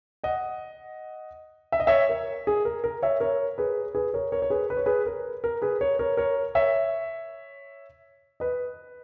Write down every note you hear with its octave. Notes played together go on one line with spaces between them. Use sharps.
D#5 F#5
E5
D#5
C#5 E5
A#4
G#4
A#4
A#4
C#5 E5
A#4 C#5
G#4 B4
G#4 B4
A#4 C#5
A#4 C#5
C#5
G#4 B4
B4
C#5
G#4 B4
A#4
A#4
G#4 B4
A#4 C#5
A#4 C#5
A#4 C#5
C#5 E5
B4 D#5